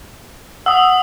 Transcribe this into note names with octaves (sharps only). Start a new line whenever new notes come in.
F#5 D#6 E6